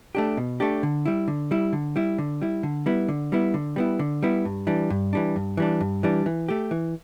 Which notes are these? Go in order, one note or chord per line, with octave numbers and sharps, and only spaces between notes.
A3 D4 G4
B2
A3 D4 G4
D3
G3 E4
D3
G3 E4
D3
G3 E4
D3
G3 E4
D3
G3 B3 E4
D3
G3 B3 E4
D3
G3 B3 E4
D3
G3 B3 E4
G2
E3 G3 D4
G2
E3 G3 D4
G2
E3 G3 D4
G2
E3 G3 D4
E3
A3 G4
E3